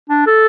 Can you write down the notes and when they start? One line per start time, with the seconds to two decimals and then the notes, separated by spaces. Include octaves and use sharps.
0.09 D4
0.27 A4